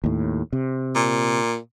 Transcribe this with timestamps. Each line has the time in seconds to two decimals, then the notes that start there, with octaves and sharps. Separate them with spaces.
0.04 D#2 A2
0.53 C3
0.95 A#2